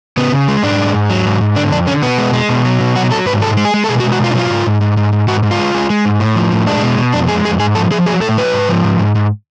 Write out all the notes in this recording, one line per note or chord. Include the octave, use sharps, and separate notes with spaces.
C#3 B3
C#3
G#3
G#2 D4
G#3
G#2
F#3
G#2
G#2
D3 D4
F2 D4
D3 C#4
B2 B3
G#3
G#3
B2
F#3
B2
F#3 F#4
F#3 A4
G#2 B4
G#3 A4
G#3
G#4
G#3
A4
B2 G#4
F#4
G#3
F#4
B2 F4
D4
F#3 F4
G#2
G#2
G#2
G#2
G#2
G#2 F#4
G#2
F4
G#3
G#3
G#3
G#2
A2
F3
A2
G#3 D4
B2
B2
F2 D4
G#3 G#4
F2 G#4
G#2 G#4
F3 A4
F3 G#4
F#3 G#4
A2 A4
F#3 B4
G#2
F3
G#2
G#2
G#2